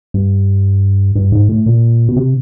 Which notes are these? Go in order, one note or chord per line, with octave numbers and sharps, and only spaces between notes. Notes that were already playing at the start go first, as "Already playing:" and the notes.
G2
G2
G#2
A2
A#2
B2
C3